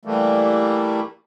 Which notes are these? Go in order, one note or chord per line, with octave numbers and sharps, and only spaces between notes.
E3 G3 A3 A#3